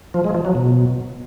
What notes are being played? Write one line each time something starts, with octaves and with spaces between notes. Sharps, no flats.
F3
G#3
F3
F#3
B2